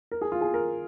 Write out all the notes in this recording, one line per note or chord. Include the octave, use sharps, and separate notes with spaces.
A#4
G#4
F4
G#4
A#4